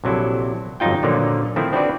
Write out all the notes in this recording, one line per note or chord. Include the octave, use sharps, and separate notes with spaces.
A#1 C3 F#3 E4 A4
G1 F2 F#3 D#4 F4 G5
A#2 D3 D#3 F3 F#3 A#3
D#3 F3 A3 C4 E4
C4 D4 E4 F#4 B4 D5